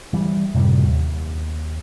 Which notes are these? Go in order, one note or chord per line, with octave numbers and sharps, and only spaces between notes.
E3 G3
F#2 A2 C3 G3
D#2